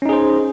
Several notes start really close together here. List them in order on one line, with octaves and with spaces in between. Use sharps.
C#4 D#4 G#4 C5